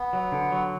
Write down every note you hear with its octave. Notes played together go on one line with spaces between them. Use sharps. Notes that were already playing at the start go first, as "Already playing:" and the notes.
Already playing: B3
F#3
D3
F#3